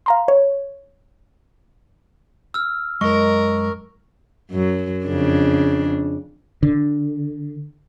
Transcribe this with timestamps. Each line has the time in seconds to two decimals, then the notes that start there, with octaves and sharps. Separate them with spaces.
0.06 F5 A#5 C6
0.28 C#5
2.54 E6 F6
3.01 F#2 G#3 A#4 D#5 C#6
4.51 F#2 F#3
5.05 F2 C#3 D4
6.63 D3